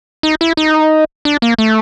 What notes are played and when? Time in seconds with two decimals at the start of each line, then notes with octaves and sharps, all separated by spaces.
0.23 D#4
0.41 E4
0.57 D#4
1.25 D4
1.42 A#3
1.58 A3